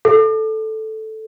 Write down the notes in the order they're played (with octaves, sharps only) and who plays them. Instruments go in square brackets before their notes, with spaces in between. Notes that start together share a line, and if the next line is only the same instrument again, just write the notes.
[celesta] A4